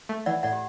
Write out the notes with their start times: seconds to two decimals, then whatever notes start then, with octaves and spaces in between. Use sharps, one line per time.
0.09 A3
0.26 E3 D5 F#5
0.43 A2 D5 F#5
0.53 G4